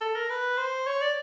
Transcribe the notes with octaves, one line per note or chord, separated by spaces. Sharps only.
A4
A#4
B4
C5
C#5
D5